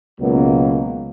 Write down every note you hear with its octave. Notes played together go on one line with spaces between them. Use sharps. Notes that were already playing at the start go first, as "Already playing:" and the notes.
C#2 B2 F#3 A#3